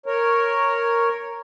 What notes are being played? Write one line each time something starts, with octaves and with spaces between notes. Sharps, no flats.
A#4 C#5